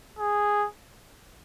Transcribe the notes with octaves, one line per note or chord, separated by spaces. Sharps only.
G#4